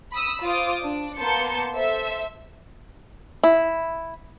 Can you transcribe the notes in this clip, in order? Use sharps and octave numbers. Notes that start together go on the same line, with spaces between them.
B5 D#6 E6
F4 C5 D6 D#6
D4
A#3 B3 A5 C6 G6 C#7
A4 C5 E5
E4